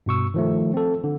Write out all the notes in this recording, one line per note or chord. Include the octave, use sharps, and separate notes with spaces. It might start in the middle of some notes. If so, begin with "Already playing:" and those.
G2 B2 C#6 E6
D#3 F3 A3
C4 A4
D3